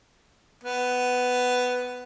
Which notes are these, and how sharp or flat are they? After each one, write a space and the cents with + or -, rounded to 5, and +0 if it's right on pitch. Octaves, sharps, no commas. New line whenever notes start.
B3 +10